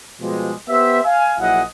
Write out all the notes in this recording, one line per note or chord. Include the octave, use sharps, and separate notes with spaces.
B2 F3 G3 G#3
B3 G4 C5 E5
F5 G#5
A#1 F#3 E4 G#4 D#5 F#5